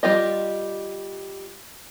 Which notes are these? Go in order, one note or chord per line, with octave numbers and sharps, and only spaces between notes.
G3 F4 G4 D#5